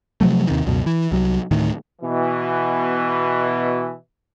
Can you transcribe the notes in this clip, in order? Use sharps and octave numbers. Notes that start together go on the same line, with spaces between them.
C3 F3 F#3 A3
D#2 C3 D#3
C#2 F#2 B2
E3
C2 F#3
D2 A2 D#3
B2 E3